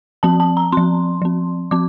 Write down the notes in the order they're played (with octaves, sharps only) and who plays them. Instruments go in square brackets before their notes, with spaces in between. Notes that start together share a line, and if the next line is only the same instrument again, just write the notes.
[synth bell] F3 C4 A5
A5
A#5
F3 C4 C6
F3 C4
F3 C4 D6